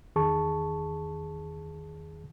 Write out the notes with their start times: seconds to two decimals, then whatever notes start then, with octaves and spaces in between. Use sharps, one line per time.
0.16 E2 D#3 G#4 A5 C#6